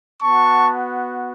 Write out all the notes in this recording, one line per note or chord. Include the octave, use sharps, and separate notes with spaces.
B3 F#4 A5 C#6